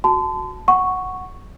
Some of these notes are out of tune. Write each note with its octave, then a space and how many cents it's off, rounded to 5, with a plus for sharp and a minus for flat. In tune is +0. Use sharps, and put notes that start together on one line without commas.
F#4 +0 A5 -5 C6 -40
F#5 +0 C#6 +0